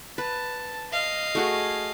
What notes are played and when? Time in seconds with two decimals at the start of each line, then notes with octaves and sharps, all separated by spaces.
0.18 B4 A5
0.92 D#5 F5
1.35 A3 F#4 G#4